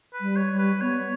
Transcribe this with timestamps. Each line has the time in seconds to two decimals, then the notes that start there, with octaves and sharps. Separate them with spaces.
0.14 B4
0.21 G3
0.36 C#5
0.51 G3
0.59 B4
0.81 B3 C#5